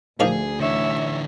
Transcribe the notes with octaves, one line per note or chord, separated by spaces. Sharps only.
D2 A#2 D#3 F3 G#4
D3 E3 C#5 E5